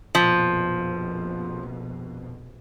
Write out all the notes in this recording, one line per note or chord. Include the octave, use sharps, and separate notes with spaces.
A#1 F2 B2 F3